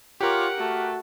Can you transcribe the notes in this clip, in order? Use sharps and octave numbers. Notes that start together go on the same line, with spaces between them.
F4 G4 A#4 C#5 F#5 D6
A3 F#4